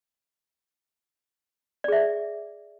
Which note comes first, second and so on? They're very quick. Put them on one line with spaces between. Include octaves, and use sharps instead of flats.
D5 G#4 E5